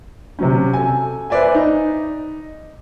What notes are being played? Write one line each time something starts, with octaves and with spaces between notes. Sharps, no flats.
C3 F#3 C#4
A4 G#5
B4 C5 D5 E5 G#5
D#4